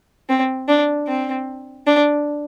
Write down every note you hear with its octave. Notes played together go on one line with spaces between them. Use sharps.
C4
D4
C4
D4